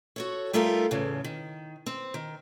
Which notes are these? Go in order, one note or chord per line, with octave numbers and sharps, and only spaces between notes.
F#4 A4 C#5
G3 A3 D#4 F4 A4 A#4
E2 A2 C#3
D#3
C4
D#3